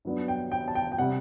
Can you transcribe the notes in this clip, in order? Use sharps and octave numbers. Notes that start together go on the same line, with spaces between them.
G2 F#3 B3 D4
G5
G5
A5
G5
G5
C3 G3 F#5